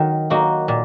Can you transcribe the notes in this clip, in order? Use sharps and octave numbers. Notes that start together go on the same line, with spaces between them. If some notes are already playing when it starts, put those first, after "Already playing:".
Already playing: D#3 F#3 F#4
F#3 A#3 D#4 F#4
A#2